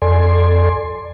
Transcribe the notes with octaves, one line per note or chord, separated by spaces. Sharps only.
F2 A4 D5 G#5 C6